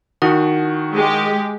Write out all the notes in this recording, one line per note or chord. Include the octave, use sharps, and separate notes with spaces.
D#3 E4 F#4 F#5 D#6
G#3 G4